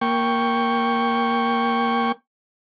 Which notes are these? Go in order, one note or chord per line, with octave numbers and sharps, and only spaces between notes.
A#3 G5 C#6